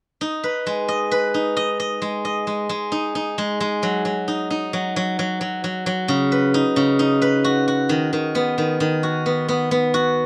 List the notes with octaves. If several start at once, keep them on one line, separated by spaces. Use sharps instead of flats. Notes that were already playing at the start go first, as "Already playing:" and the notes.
D#4
B4
G#3
D#5
B4
D#4
D#5
D#5
G#3
D#5
G#3
G#3
D#4
D#4
G#3
G#3
F#3
F#3
D#4
D#4
F#3
F#3
F#3
F#3
F#3
F#3
C#3
B4
D#4
C#3
D#4
B4
F#4
F#4
D#3
D#3
B3
D#3
D#3
F#4
B3
B3
B3
F#4